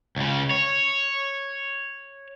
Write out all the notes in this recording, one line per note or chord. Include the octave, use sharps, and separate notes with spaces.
C#2 C#3
C#5